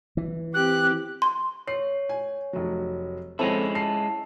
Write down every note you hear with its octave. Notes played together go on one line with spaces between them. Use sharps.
E3
C4 G4 F#6
C6
C#5 C7
G#5
F1 F#3
F3 G#3 C4 C#4 E4 A4
A5 C7